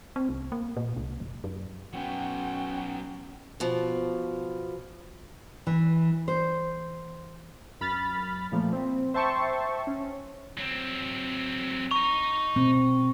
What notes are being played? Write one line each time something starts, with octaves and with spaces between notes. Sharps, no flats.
C4
C2
A#3
A#2
C2
F1
F#2
F#3 B3 C#4 F#5 G5
B2 F3
E3
C5
F#2 B5 F6 A6
A#2 F3 A3 A#3
C4
C5 E5 G5 A5 C6 C#6
C#4
F#3 C4
D#5 A#5 C#6
B2 C4